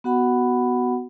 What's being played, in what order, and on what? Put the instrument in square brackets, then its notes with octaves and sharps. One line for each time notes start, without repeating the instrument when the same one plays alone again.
[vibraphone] B3 F#4 F#5 B5